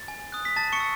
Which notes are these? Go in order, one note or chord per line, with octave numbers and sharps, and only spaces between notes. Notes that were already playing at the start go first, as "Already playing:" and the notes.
Already playing: A6
G#5
D#6 F#6
B6
A5 A6
C#6 C#7
E6